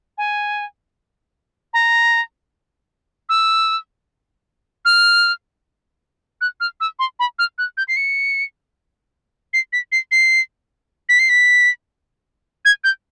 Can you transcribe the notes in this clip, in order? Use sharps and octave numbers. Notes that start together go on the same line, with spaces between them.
G#5
A#5
E6
F6
F#6
F6
E6
C6
B5
F6
F#6
G6
C7
C#7
C7
B6
C7
C7
B6
C7
B6
G#6
G6